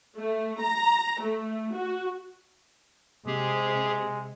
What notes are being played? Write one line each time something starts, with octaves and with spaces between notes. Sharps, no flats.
A3
A#5
A3
F#4
C3 G#3 G4 G#4